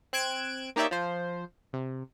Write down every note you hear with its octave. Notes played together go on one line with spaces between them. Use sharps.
C4 F#6 G#6 D7 E7
A#3 D#4 G4 C#5 D5 E5
F3 C5
C3